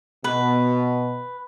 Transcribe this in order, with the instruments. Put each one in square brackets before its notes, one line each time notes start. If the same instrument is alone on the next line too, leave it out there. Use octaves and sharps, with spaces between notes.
[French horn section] B2 [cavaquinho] B4